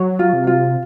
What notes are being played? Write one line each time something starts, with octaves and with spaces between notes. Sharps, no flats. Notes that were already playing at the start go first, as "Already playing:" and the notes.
Already playing: F#3 C#5
F4
C3
F4